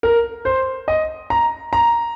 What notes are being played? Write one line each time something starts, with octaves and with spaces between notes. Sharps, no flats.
A#4
C5
D#5
A#5
A#5